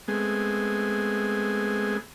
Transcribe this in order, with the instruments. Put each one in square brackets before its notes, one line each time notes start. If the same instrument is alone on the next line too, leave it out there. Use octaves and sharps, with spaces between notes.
[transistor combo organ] G#3 A3 B3 C4 G#4